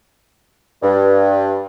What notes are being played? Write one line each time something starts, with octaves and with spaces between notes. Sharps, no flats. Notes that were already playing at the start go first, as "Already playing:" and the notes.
G2